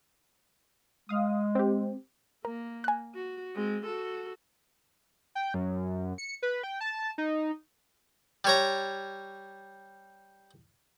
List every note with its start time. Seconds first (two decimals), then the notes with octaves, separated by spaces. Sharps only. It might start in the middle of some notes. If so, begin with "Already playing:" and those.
1.09 G#3 F5 D#6
1.55 C4 G4
2.45 A#3 A#4
2.84 G#5 F#6
3.14 F#4
3.55 G#3 C4
3.86 F#4 A4
5.35 G5
5.54 F#2
6.18 C#7
6.42 B4
6.63 G5
6.81 A5
7.18 D#4
8.45 G3 C#5 A#5